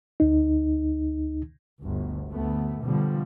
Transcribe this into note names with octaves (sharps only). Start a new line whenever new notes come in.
D2 D#4
G1 D2
D2 A3 B3
B2 D3 F3 G3